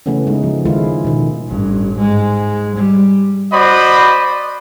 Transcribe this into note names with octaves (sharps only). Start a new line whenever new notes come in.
C#3 E3 A3 B3 C#4
G#3 D#4
F3
D#3 G#3 E4 F4
B2 D#3
A1 G2
G#2 G#3
G3
F#4 C5 D5 D#5 B5 D#6